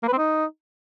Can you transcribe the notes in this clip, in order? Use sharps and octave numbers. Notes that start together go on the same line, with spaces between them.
A#3
B4
C4
D#4